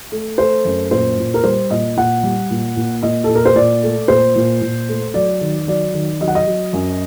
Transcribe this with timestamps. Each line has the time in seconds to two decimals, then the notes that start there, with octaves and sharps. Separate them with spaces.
0.12 A3
0.38 A3 C5
0.65 F#2
0.91 A#2 C5
1.18 A#2
1.34 A#4
1.44 G3 C5
1.71 A#2 D#5
1.97 A#2 F#5
2.23 G3
2.50 A#2
2.77 A#2
3.03 A#2 D#5
3.24 A#2 A4
3.35 A#4
3.45 C5
3.55 A#2 D5
3.83 A3
4.08 A#2 C5
4.36 A#2
4.61 A#2
4.88 A3
5.14 F#3 D5
5.41 D#3
5.68 F#3 D5
5.94 D#3
6.21 F#3 D#5
6.28 F#5
6.35 D#5
6.47 F#3
6.73 F#2